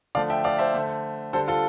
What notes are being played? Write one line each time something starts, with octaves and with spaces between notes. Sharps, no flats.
D3 F3 A3 D5 F5
E5 G5
D5 F5
C5 E5
D3 A3
D3 G3 A4 C5
F4 A4